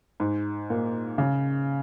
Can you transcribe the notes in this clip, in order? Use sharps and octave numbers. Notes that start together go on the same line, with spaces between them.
G#2
A#2
C#3